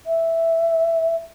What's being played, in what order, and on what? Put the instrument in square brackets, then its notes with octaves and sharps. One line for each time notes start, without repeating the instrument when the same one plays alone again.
[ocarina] E5